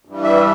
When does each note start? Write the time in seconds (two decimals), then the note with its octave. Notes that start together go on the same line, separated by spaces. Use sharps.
0.05 G2 E3 G3
0.24 E5